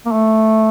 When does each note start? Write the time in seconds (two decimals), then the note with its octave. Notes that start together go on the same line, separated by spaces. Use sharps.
0.05 A#3
0.12 A3